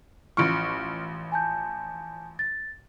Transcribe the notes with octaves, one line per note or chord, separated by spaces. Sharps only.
A1 F3 C#6 F6 C#7 D7
G#5 A5 G6
A6